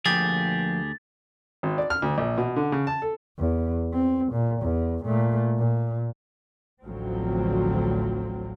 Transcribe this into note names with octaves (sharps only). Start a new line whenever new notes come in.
D2 F3 A#3 G4 G#4 G5 A6
G#1
D5
F6
D2
A#1
B2
D3
C#3
A5
A4
E2
C4
A#2
E2
A#2 A3
A#2
A1 D2 D3 F3 F#3 C4